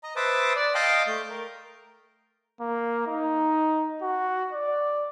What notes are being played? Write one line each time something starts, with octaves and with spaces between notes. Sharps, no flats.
D#5 A#5
B4 C5 E5 A5 D6 D#6
D5
D#5 F5 G5 A5 C6 D6
A3 G6
A#4
A#3
D#4
F#4
D5